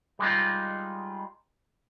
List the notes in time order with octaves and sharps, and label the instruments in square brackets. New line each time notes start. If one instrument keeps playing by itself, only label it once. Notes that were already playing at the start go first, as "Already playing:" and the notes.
[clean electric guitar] G3 G#3 D#4 F4